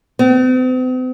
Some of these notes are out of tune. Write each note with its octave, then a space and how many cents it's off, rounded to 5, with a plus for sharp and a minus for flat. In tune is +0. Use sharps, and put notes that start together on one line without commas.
C4 -45